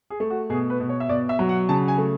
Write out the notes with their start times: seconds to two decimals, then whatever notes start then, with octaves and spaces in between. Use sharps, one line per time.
0.10 G#4
0.20 A3
0.30 F#4
0.50 B2 G#4
0.70 B4
0.80 B2
0.89 C#5
1.00 E5
1.09 B2 D5
1.29 E5
1.39 F#3
1.49 F#5
1.69 C#3 A5
1.88 G#5
1.98 A3